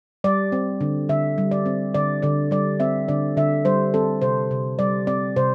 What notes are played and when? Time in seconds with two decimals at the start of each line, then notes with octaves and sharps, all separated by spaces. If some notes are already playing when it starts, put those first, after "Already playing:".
0.24 G3 D5
0.52 C4
0.81 D3
1.09 D3 E5
1.38 G3
1.51 D5
1.66 C4
1.94 D3 D5
2.22 D3 D5
2.51 G3 D5
2.80 C4 E5
3.08 D3 D5
3.37 D3 E5
3.65 G3 C5
3.94 C4 A4
4.22 C3 C5
4.51 C3
4.79 G3 D5
5.07 C4 D5
5.36 C3 C5